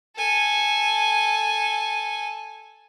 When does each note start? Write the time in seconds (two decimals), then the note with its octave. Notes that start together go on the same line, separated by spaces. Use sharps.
0.17 A4 G#5